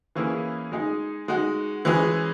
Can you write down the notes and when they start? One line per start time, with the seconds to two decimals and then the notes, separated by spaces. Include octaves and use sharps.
0.15 E3 A#3 C#4 E4 G#4
0.72 G#3 D#4 G#4
1.28 G#3 D#4 F#4
1.85 E3 G#3 C#4 G#4